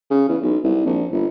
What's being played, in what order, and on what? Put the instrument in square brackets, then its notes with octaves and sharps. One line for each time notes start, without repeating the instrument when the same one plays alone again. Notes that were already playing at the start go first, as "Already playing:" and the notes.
[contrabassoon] C#3
E2
B1
C2
A#1
G1